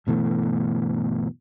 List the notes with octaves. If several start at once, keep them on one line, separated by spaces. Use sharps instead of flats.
G1 B2 E3 A3